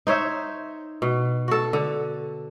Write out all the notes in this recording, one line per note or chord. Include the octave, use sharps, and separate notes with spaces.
D#4 C5 C#5 E5
B2
F#4 A4
D3